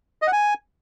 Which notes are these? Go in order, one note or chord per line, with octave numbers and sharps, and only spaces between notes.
D#5
F#5
G#5